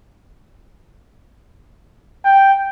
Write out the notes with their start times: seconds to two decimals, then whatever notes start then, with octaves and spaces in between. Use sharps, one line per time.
2.25 G5